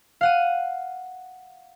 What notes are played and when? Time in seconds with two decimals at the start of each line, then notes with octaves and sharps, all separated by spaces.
0.21 F5 F#5 D#7